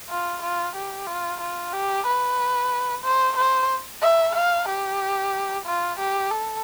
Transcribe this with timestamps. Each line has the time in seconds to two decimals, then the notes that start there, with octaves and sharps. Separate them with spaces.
0.10 F4
0.42 F4
0.75 G4
1.07 F4
1.41 F4
1.73 G4
2.06 B4
3.04 C5
3.37 C5
4.01 E5
4.35 F5
4.68 G4
5.66 F4
5.99 G4
6.31 A4